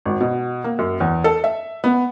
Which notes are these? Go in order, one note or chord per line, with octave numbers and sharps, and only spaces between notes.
G#1
B2
A#3
F#2
E2
A4
E5
B3